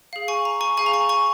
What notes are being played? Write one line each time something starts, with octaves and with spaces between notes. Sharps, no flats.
G#4 F5
G#5 C#6
A#5
G#5 C#6
G#4 F5 G#5 C#6
A#5
G#5 C#6
G#5 C#6